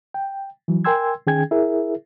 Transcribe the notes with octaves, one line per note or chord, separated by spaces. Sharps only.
G5
E3 F#3
A#4 G5 G#5 C6 E6 G#6
D#3 C#4 G#4 G5 G#5 G#6
E4 G#4 A#4 E5